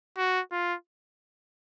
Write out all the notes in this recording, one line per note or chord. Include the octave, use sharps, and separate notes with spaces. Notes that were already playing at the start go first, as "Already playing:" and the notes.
F#4
F4